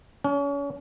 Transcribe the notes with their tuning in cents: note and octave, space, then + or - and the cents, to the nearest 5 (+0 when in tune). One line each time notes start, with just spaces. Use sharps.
C#4 +35